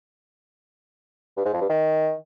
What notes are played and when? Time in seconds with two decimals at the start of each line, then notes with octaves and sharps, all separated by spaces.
1.37 G2
1.45 G#2
1.53 F2
1.61 G2
1.69 D#3